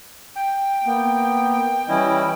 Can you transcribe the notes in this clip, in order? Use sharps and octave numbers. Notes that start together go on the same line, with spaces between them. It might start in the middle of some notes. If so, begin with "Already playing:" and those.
G5
A#3 B3
E3 G3 C#4 E4 D#5